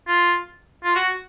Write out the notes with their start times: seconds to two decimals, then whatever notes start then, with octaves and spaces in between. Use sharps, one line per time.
0.07 F4
0.84 F4
0.95 F#4